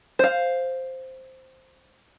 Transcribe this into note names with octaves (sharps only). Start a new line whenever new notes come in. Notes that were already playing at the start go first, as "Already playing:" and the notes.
C5 F5